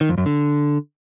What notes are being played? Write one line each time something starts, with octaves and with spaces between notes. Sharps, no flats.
D#3
F2
F#2
D3